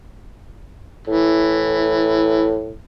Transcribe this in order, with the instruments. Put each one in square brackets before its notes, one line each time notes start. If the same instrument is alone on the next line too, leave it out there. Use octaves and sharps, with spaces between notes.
[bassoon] A2 [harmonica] E3